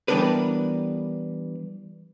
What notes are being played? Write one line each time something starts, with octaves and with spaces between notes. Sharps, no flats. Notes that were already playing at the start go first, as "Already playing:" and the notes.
E3 G3 B3 D4 A#4 B4